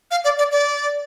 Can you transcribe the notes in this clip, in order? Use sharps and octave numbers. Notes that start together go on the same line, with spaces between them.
F5
D5
D5
D5